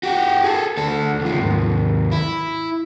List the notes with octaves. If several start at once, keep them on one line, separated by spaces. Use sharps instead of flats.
F#4 G4
G#4 A4
D2 A4
C#2 F3
D#2 G#2
E4